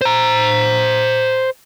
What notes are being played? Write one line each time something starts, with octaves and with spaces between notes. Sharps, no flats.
C5 A#5